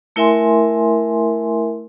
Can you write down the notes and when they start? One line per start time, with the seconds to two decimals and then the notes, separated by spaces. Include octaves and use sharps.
0.16 A3 E4 A#4 E5 G#5 C6